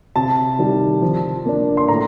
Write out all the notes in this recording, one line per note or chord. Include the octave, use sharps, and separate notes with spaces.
C3 A5
D#3 G3
F3
A#3 D4
C6
A2 A#5